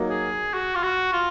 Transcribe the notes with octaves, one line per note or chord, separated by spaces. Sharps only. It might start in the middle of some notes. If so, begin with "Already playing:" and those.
Already playing: F#3 A#3 D#4
G#4
F#4
F4
F#4
F4